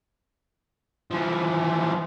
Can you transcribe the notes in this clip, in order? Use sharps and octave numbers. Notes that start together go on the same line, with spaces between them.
E3 F3